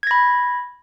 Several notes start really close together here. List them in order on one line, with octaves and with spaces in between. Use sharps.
G#6 A#6 B5